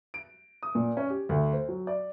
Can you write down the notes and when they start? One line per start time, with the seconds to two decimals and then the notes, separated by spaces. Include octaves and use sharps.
0.14 D7
0.63 D#6
0.75 A#2
0.97 C#4
1.10 G4
1.29 D2
1.53 C5
1.69 F#3
1.87 D5